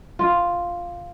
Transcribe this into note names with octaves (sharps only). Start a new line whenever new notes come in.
F4